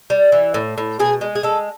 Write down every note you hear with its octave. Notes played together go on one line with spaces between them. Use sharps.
G3
E3
A2
A2
B2 G#4
G#3
G#4
G#3 A4